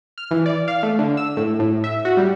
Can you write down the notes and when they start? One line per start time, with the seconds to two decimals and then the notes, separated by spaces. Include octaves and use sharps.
0.18 F6
0.31 E3
0.46 D5
0.68 F5
0.83 A3
0.99 D3
1.17 E6
1.37 A2
1.59 A2
1.84 E5
2.05 F#4
2.17 G3